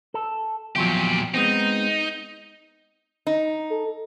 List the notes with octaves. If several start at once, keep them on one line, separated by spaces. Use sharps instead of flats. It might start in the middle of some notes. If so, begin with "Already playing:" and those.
A4
E2 A#2 F3 F#3 G4
G#3 B3 C4 D#4
D#4
A4